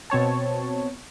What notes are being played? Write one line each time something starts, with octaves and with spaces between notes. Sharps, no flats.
B2 C4 C#5 A5